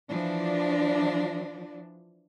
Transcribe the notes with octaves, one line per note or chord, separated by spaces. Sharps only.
E3 F3 D4